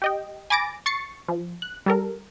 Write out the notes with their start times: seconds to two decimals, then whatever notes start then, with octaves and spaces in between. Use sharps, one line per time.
0.02 G4 D#5 G5
0.50 G#5 B5 D6 A6 A#6 D7
0.86 C#6 A6 C7 C#7
1.28 F3
1.62 F#6
1.86 G3 A4 A#4